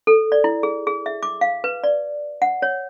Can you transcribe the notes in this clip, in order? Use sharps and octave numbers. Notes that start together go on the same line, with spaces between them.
A4
D5
E4
G#4
G#4
E5
D6
F5
B4
D5
F#5
C#5